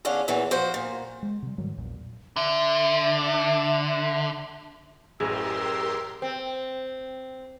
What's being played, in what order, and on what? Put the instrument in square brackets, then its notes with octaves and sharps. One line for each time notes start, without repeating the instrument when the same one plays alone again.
[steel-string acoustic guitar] E2 D3 C#4 D4 F5
E2 A#2 E3 F#3
F3 F#4 C5
A#2
[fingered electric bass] G#3
C3 G3
G#2 D#3 F#3 G3
A#1 E2 A#2
[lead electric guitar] D3 [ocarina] E5
[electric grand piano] A1 F#2 A2 [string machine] G4 A#4 C6 [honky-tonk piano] G#4 [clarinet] E6
[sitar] C4